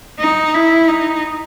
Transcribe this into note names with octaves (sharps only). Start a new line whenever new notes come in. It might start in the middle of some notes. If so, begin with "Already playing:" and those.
D#4
E4
D#4